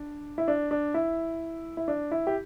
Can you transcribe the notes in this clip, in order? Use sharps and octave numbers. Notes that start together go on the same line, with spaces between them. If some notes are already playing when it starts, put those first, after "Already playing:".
Already playing: D4
E4
D4
D4
E4
E4
D4
E4
G4